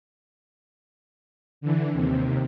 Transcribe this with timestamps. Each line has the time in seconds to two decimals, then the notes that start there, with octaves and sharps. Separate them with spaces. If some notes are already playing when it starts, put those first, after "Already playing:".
1.61 D3 E3
1.92 D#2 C3